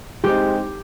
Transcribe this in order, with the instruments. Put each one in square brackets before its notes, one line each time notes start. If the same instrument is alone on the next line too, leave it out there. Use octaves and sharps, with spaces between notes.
[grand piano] G#3 C4 D#4 [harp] G4